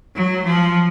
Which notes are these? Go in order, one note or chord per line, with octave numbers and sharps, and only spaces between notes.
F#3
F3